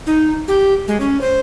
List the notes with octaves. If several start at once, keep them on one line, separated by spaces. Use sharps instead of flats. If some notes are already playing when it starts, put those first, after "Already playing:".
D#4
G4
G#3
C#4
C5